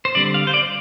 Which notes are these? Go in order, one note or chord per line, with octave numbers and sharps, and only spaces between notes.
C5
D3 G3 C4 D5
F5
C5
D5